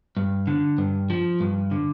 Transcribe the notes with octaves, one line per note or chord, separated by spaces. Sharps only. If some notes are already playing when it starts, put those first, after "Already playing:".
G2
D3
G2
F3
G2
D3